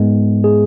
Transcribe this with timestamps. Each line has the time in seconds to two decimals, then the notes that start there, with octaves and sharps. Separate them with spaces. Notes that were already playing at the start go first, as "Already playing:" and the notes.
Already playing: G#2 G#3 B3
0.44 G#4